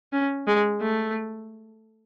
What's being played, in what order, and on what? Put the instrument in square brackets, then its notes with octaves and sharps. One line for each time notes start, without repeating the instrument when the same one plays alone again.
[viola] C#4
G#3
A3